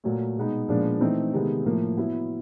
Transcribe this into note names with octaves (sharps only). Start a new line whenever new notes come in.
A#2 F#3 A3
B2 G#3 B3 D#4
A#2 F3 G#3 B3 D4
E3 A3 C4 D#4
C3 D#3 G#3 B3
A2 F3 A#3
F#3 B3 E4